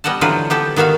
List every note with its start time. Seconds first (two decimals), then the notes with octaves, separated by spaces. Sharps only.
0.04 G3 B3 D#5 F#5 A5
0.21 D3 E3 F#3 C4 F4 B4
0.50 B3 G4 A4
0.76 D#3 B3 F#4 E5 F5